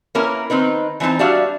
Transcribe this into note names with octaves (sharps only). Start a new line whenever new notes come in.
A#3 C#4 E4 A#4 B4
D#3 C4 D#4 B4
E3 G#3 C4 D#4 A5
G3 D4 F#4 E5 F5